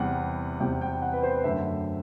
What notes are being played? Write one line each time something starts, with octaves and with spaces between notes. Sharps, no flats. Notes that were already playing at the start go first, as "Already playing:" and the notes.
Already playing: E2 C3 G3 F#5
E2 C3 G3 G5
G5
F#5
B4
C5
F#2 D3 A3 E5